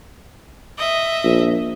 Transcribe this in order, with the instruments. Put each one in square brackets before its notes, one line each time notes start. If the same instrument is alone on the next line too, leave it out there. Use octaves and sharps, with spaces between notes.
[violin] D#5 E5
[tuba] A#1